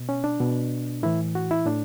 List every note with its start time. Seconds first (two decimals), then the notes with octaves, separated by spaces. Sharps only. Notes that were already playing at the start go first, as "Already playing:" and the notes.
Already playing: B2
0.09 C#4
0.24 D4
0.40 B2
1.03 A2 E3 E4
1.35 F#4
1.51 E4
1.66 A2 D4